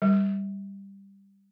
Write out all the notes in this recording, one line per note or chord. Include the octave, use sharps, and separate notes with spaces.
G3